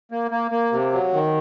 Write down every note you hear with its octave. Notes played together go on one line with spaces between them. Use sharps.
A#3
A#3
A#3
C3
F#3
D#3